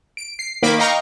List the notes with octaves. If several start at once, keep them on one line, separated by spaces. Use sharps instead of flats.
D7
C7
D#3 A#3 A#4 B5 D6
D#5 F5 G5 A#5 C#6